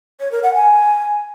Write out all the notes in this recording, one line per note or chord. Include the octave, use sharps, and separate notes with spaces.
C#5
A#4
F#5
G#5